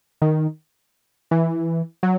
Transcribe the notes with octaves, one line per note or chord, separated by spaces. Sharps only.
D#3
E3
F#3